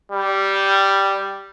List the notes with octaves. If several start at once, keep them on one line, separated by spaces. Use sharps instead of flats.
G3